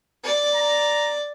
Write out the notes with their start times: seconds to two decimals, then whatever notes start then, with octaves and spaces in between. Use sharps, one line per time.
0.24 D5
0.55 A#5